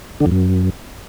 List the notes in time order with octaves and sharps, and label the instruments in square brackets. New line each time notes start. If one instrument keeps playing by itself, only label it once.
[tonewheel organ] D3
F2
F#2